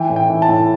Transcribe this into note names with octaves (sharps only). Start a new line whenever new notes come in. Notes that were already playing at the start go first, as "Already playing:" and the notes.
Already playing: E3 G5
A2
G5
E3
A5
A2